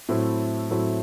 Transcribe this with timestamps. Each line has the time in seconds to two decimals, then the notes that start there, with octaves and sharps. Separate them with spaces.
0.09 A2 F#3 A3 C4 E4
0.71 A2 F#3 A3 C4 E4